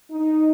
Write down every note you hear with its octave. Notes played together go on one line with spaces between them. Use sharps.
D#4